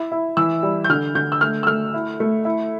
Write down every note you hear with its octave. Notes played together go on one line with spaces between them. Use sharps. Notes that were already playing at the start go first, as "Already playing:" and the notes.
Already playing: E4
E4
E3 E6
G3
G6
D3 F6
D3 G6
E6
A3 F6
E6
A3 F6
E4
A3
E4